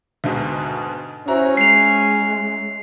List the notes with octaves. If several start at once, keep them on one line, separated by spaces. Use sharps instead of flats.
D2 G#2 B2
C#4 E4 F#4 C5 A#5
G#3 C7 F7